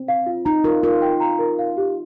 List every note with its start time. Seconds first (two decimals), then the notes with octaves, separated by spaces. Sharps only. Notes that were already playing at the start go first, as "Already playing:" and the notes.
Already playing: C4
0.08 F5
0.26 F4
0.45 D#4 A#5
0.64 F4 A#4
0.83 F4 A#4
1.02 G5
1.20 A#5
1.39 A#4
1.59 F5
1.77 G4